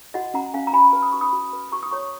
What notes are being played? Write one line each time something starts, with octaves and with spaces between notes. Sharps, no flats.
F#4 D#5 F#5
C#4 F#5 A#5
C#4 F5 G#5
A#5
F#4 G#5 B5
B4
D#6
F#4 C#6
B5 D#6
F#4
B4
F#4 A#5 C#6
D#6
C#5 A#5 C#6